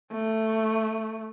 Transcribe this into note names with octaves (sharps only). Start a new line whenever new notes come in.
A3